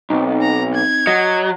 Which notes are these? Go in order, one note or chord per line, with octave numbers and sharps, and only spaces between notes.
B1 C4 D#4
A#5
G#6
F#3 D#5